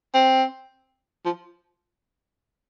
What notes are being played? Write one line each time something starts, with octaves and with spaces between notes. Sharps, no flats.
C4
F3